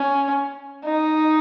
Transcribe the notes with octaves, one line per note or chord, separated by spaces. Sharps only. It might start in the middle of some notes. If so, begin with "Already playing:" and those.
Already playing: C#4
D#4